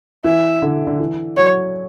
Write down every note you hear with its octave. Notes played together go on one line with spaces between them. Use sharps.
E3 E5
D3
D3
E3
F#3 C#5